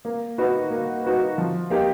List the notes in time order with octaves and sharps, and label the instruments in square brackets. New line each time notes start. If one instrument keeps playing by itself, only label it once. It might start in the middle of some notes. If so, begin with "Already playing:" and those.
[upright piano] A#3
D#4 F#4 B4
A#3
D#4 F#4 B4
F3
A#3 D#4 G4